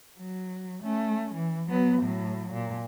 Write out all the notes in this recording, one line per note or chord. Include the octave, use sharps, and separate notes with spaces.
F#3
A3 C#4
E3
F#3 B3
A2 F#3
A#2